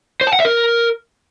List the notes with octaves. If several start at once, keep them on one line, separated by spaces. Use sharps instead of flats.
C5
A5
F#5
E5
A#4